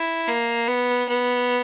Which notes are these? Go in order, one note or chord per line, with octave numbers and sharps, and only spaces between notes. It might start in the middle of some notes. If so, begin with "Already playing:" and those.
Already playing: E4
A#3
B3
B3